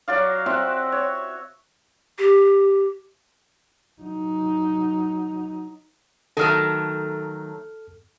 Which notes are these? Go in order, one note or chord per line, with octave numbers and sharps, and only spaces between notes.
F#3 F#4 D5 F5
C4 F#4 E5 F#5
C#5
G4
F#3 D#4
D#3 F#3 A3 A4 F6